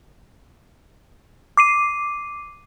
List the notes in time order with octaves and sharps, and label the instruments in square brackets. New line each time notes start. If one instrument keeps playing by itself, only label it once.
[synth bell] D6 C7 D#7